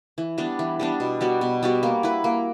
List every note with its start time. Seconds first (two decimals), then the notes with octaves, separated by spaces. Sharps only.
0.18 E3
0.38 G3 B3 D4
0.59 E3
0.79 G3 B3 D4
1.00 B2
1.21 G3 B3 F#4
1.41 B2
1.63 G3 B3 F#4
1.83 A#3
2.03 E4 B4
2.24 A#3